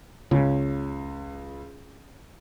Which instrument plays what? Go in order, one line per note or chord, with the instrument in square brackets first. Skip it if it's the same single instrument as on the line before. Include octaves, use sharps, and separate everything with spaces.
[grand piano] C#2 [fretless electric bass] C#3